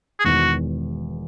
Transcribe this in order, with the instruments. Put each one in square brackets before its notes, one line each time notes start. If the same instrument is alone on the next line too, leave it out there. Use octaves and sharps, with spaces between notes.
[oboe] G#4
[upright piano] E1 E2 D#3 [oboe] F#4